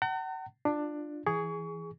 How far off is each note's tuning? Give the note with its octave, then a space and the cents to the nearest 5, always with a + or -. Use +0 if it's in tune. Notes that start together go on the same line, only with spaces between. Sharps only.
F#5 +40 A#5 -45
D4 +15 F4 +0
E3 +0 G#4 +0 C#6 +30